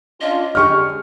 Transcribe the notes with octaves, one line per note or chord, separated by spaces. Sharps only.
C#4 D4 F4 D#5
D3 G#3 C#4 G4 G#4 C#6 F6